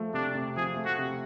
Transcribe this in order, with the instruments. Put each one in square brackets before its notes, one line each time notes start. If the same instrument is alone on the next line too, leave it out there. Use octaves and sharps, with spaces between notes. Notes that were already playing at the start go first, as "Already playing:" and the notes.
Already playing: [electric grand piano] F3 A3
[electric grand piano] C3 [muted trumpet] D4
[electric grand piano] C3
[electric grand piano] F3 [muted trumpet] G#4
[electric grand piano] A3
[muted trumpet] F#4
[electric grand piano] C3